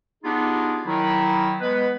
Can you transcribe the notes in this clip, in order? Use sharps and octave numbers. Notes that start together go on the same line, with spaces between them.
B3 D4 D#4 F4 G4 G#4
D#3 F#3 E4
G#3 B3 B4